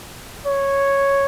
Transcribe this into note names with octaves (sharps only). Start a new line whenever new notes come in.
C#5